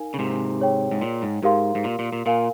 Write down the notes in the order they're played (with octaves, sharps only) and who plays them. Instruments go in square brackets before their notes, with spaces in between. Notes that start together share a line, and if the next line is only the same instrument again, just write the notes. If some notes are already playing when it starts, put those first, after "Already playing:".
Already playing: [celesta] D#4 A#4 F5 G#5
[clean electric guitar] C#3
G#2 C3
[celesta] G#4 C#5 G5
[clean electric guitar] G#2
A#2
G#2
[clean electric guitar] G#2 [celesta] G4 A#4 F5 C6
[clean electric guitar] G#2
A#2
A#2
A#2
[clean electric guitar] A#2 [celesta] A#4 F5 G#5